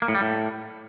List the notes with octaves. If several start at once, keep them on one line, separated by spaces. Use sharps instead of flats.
A#3
A2
G3
A2